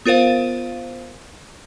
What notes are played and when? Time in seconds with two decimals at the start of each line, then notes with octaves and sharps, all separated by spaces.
0.06 B3 F4 A#4 C5 F5